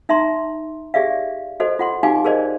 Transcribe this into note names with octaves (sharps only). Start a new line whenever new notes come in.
D#4 E5 A#5 C6
G4 G#4 D5 E5 F5
F#4 A4 C5 D#5
F4 F#5 C6
D#4 F#4 G4 F5 G#5 D6
G#4 A#4 C5 D5 D#5